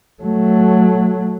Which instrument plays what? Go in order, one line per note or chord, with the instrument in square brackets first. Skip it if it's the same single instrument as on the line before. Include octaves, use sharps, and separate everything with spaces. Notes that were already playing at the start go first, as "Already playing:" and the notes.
[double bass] F#3 A3